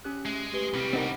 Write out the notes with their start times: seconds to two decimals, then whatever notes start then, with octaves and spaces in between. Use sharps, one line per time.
0.04 C#4 G4 F#6
0.26 G#3 E5
0.53 G4 B4 G7
0.74 C2 G3 C4 B5
0.93 C4 D#4 A#4 F#5